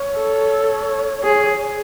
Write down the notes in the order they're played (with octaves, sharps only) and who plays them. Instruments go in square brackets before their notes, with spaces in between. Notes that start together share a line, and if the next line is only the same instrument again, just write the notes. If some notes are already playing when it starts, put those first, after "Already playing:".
Already playing: [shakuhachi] C#5
[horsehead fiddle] A4
G#4